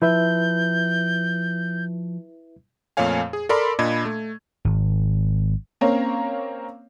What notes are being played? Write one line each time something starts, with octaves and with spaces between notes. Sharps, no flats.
F3 E4 B4 E5 G6
F2 A#2 A3 C#5 F5 G#5
G#4
A4 A#4 D5 B5 C6 D6
A#2 D4 D#5 B5 G#6
A3
G#1
A#3 C4 C#4 A#4 C#5 F5